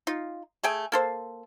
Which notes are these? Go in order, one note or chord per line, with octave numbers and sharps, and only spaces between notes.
D#4 F4
A3 G#4 G5 G#5
A#3 A4 C5